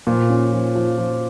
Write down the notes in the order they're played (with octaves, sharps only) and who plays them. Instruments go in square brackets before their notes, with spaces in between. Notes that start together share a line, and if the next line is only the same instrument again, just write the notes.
[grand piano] A#2 [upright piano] F3
[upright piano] C#4
F3
F3
F3